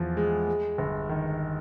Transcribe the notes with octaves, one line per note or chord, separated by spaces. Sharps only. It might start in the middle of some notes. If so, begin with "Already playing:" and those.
Already playing: E2 F3
G#3
G#3
G1
D#3